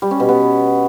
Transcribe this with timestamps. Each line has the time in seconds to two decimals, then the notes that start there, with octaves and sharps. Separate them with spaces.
0.02 G3
0.11 C#4
0.20 B2
0.29 B3